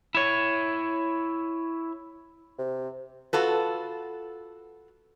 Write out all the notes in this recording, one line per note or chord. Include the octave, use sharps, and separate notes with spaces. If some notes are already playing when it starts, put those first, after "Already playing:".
E4 C#5
C3
F4 F#4 A4 B4